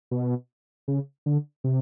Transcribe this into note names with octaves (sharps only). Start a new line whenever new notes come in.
B2
C#3
D3
C3